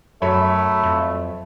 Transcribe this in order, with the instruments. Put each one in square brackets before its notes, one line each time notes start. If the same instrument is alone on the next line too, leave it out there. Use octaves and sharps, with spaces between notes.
[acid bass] F#2 [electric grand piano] F#3 C#5 B5 [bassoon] A3
[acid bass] F2